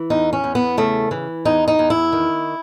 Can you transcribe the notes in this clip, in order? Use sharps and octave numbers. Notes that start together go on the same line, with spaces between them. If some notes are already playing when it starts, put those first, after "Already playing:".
Already playing: E3
E2 D#4
C#4
E2
B3
C#3 A3
E3
E2 D#4
D#4
E2
E4
D#3